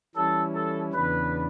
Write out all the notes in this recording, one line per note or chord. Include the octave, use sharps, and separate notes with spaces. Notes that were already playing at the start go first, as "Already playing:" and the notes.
E3 G3 C#4 E4 A4
A4
E2 C#3 E3 B3 D4 B4